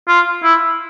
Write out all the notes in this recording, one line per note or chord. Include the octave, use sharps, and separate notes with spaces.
F4
E4